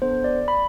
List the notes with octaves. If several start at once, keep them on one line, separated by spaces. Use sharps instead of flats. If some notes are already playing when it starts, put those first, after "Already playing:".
B3 D4 A4 C5
D5
B5